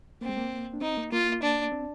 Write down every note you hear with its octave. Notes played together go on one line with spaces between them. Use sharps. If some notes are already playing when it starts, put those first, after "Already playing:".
A#3 C4
G#3
A#3
D4
C4 D#4
A#3
A#3 F4
D4
C4